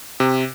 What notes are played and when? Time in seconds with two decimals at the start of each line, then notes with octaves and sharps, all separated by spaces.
0.20 C3